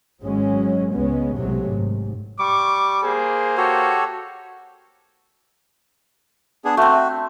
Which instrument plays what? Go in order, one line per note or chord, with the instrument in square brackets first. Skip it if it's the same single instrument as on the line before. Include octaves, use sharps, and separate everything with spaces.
[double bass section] G#1 G#2 F#3 G#3 C#4
C#2 G#3 B3 C#4
B1 A2 C3 F#3 G#3 A3
G#1 G#2
[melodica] G3 [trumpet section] C#6 D6
[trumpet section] A#3 C5 [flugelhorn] G#4
[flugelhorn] F#4 [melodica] G4 A4 C#5
[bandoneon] B3 D4 G#4
[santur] A3 C4 [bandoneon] F#4